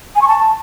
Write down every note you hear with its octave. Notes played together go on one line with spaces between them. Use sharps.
G#5
C#6
A5